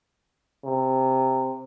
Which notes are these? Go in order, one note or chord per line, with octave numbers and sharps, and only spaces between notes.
C3